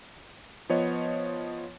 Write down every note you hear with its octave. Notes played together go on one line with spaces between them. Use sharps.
F3 B3 C#5 D#5